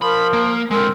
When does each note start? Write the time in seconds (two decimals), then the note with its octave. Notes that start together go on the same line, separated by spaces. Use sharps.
0.02 F3 A#4 B5
0.33 A#3
0.71 D3 G#3 C4 A#4